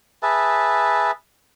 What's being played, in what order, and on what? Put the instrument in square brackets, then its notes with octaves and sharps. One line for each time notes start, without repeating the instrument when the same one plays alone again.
[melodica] G#4 B4 E5 A5